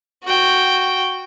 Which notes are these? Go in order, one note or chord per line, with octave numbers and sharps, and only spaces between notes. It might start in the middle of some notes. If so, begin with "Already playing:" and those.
F#4 G5